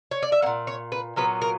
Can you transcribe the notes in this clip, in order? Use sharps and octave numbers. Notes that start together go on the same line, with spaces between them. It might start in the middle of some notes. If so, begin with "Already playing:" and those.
C#5
D5
E5
A#3 F#5
A#2
C#5
B4
A#2 F#3 B3 B4
A#4